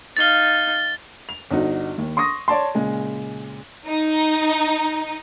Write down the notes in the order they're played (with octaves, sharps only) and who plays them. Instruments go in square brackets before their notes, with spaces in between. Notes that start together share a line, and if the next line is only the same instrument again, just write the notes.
[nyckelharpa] D#4 F5 [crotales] A6 G7
[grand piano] F7
G1 D#4 F#4
D#2
C6 C#6 D#6 A#6
C#5 D5 A5 C6
A#2 C#3 G#3
[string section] D#4